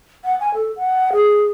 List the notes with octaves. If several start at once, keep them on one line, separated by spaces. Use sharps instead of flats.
F#5
G#5
A4
F#5
G#4